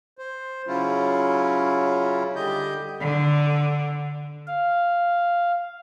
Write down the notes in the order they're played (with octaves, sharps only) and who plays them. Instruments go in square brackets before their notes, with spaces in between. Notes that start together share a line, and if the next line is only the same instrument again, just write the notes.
[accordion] C5
C#3 F#3 C#4 E4 F4
D3 G3 G4 D#5 G6
[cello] D3
[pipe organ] F5